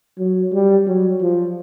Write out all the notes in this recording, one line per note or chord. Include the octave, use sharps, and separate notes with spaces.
F#3
G3
F#3
F3